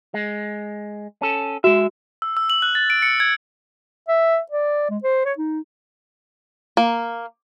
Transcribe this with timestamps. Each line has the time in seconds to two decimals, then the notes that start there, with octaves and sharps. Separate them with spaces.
0.14 G#3
1.22 C#4 A4
1.64 G#3 F#4 E5
2.22 E6
2.37 E6
2.50 F#7
2.62 F#6
2.75 A6
2.90 D7
3.02 C#7
3.20 G#6
4.08 E5
4.52 D5
4.90 G#3
5.03 C5
5.25 C#5
5.38 D#4
6.77 A#3